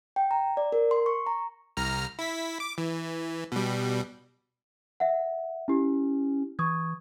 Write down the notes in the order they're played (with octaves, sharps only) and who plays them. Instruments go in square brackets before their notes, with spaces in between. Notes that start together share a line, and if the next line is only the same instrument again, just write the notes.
[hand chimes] G5
A#5
D5
A#4
C6
C#6
A#5
[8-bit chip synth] C2 A#5 F6
E4 B6
D6
E3
B2 G3
[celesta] E5 F#5
[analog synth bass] C#4 [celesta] E4 G4
[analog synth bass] E3 [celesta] C#6 D#6 G#6